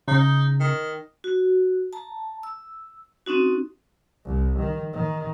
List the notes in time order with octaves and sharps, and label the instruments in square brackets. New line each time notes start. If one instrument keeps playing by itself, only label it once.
[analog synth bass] C#3 [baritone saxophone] D#4
[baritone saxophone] D#3
[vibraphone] F#4
A5 A#5
E6
C4 C#4 D#4 F#4
[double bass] C2
D#3
D#3